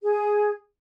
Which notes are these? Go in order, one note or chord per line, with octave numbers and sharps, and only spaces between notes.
G#4